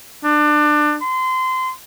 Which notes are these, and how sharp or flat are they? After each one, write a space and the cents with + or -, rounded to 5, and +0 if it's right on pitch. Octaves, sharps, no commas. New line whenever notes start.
D4 +25
C6 -25